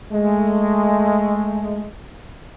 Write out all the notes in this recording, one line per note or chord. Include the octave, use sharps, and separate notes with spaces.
G#3 A3